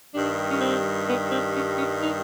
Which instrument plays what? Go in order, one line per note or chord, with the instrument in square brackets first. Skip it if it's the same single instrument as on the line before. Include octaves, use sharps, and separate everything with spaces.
[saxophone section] G2 D#3 G3 D4
C#4
C4
B3
C4
C#4
C#4
D#4